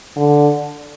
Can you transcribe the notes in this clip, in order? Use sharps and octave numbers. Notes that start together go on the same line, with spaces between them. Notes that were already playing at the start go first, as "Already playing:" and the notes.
D3